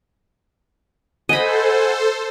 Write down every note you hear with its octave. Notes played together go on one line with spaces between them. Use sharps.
A4 C5 D#5 F#5 G#5 B5